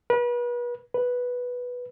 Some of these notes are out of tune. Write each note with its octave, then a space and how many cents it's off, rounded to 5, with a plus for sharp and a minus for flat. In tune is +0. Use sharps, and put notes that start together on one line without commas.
B4 -35
B4 -5